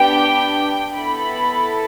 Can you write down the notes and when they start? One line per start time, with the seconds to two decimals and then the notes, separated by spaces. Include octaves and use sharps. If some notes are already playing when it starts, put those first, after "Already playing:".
Already playing: B3 D4 G4 G5
0.93 B3 E4 A4 B5